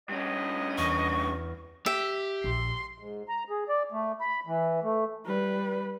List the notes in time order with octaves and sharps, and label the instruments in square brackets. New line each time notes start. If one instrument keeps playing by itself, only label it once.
[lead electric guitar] G2 C#4 [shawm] D#5
[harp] E2 [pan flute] C#6
[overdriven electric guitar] G4 [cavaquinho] E5
[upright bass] A#1 [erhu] C6
[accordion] G#2
A#5
G#4
D5
A3
B5
E3
A3
[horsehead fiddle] G3 B4